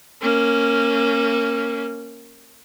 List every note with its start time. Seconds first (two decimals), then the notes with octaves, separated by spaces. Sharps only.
0.22 A#3 C#4